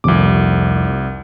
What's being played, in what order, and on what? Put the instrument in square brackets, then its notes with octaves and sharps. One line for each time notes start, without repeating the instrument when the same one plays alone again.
[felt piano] F1 F2 [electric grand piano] C2 D6